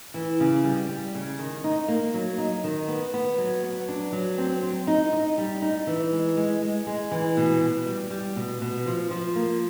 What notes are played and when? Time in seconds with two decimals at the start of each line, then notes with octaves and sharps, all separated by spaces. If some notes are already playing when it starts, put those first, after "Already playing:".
0.14 E3
0.40 C#3
0.64 G3
0.89 G3
1.15 C#3
1.39 D#3
1.64 D#4
1.88 A#3
2.14 F#3
2.38 D#4
2.64 D#3
2.88 B3
3.14 B3
3.38 F#3
3.63 B3
3.89 D4
4.12 F#3
4.38 C4
4.63 C4
4.87 D#4
5.13 D#4
5.38 G3
5.62 D#4
5.87 E3
6.12 G#3
6.37 G#3
6.62 G#3
6.87 G#3
7.11 E3
7.37 B2
7.61 B2
7.86 G3
8.11 G3
8.36 B2
8.61 B2
8.86 F3
9.10 F3
9.36 A#3